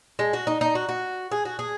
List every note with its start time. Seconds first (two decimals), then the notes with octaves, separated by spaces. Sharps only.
0.19 G#3
0.33 F#4
0.47 D#4
0.61 D#4
0.75 F#4
0.89 F#4
1.31 G#4
1.45 F#4
1.59 G#4